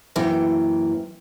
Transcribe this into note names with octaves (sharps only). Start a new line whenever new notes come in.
F#2 E3 A#3 G5